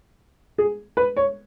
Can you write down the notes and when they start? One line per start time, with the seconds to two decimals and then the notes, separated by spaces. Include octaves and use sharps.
0.58 G#4
0.97 B4
1.17 C#5